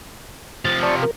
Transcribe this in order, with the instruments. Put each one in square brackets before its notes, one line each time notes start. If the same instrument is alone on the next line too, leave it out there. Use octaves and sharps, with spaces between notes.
[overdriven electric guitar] C3 F3 [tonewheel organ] A6
[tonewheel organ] D5 A5 C#6
A#4